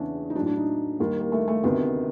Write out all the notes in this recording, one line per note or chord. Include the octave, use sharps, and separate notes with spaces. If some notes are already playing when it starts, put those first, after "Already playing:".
Already playing: E2 C#3 E3 C#4 D4
D#4
A2 F#3 D4
D4
D#4
D#2 D#3 G3
A#3
A3
A3
D2 C3 D#3 B3